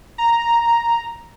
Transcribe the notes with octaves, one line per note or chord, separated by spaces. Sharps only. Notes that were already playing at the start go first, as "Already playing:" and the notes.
A#5